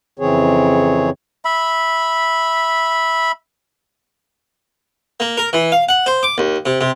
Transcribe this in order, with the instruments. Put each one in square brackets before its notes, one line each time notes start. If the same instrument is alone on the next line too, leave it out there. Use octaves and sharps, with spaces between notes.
[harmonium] F2 C#3 E3 C4 G#4 C#5
[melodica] E5 B5
[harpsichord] A#3
A#4
E3
F5
F#5
C5
D6
D#2
C3
C3